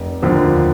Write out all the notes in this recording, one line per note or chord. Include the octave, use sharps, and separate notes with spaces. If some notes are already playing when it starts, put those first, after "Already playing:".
Already playing: F1
D#2 D3 F3